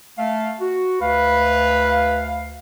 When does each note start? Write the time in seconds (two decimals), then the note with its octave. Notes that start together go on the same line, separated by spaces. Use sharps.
0.19 A3 F5
0.60 F#4
1.01 D2 B4 F5